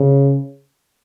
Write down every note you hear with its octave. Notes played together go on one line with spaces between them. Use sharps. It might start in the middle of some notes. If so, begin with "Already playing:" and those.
Already playing: C#3